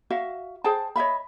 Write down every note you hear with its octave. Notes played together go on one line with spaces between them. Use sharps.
F#4 E5 F5
G#4 C5 G5 A5
C#5 D#5 E5 B5